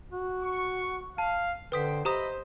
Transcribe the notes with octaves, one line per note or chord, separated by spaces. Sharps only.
F#4
C#6
F5 A5
D3 B4 C5 G5 D#6 B6
G4 C5 D#5 E5 A#5 B5 D#6